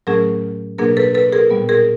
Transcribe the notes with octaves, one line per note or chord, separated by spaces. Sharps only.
A2 F#3 A3 C#4 G#4 A#4
B2 F#3 A#3 D4 G#4 A#4
A4 B4
A4 B4
G#4 A#4
A#2 G3 B3
G#4 A#4